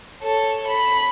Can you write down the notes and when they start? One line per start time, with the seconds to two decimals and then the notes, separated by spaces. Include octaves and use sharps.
0.23 A4 C#5
0.67 B5